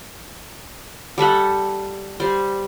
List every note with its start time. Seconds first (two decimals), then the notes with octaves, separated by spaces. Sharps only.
1.18 G3 A4 E5 F#5
2.20 G3 C5